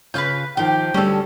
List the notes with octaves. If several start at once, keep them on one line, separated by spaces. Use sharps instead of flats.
C#3 F4 B4 F5 F#6 G6
D#3 F3 G4 G5
D2 D3 G3 C#4 A4